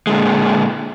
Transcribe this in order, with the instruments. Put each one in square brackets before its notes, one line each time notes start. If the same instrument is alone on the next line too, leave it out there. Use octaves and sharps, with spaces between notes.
[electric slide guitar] A#2 D3 G#3